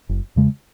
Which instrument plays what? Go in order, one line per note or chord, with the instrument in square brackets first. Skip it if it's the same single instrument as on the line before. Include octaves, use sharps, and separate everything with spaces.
[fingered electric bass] F#1
E2 C#3 G#3